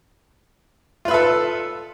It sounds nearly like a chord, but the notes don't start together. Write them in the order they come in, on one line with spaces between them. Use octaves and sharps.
F4 B4 E5 A4